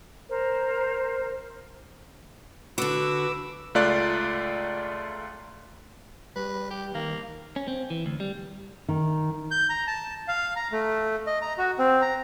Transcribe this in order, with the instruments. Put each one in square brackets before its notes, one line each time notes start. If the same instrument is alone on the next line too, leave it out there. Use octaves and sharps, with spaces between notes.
[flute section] A#4 C5
[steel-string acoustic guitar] D3 F#4 [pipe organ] B4 D6 E6
[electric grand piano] C#2 A3 F4 D5 F#6
[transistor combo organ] G3 [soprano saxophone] B4
[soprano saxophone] G4
[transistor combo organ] D#3 [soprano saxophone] A#3
[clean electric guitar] C#4
C4
E3
D2
G3
[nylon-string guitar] D#3
[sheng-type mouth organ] G6
A#5
A5
F5
A#5
A3
D#5
A#5
F#4
C4
A#5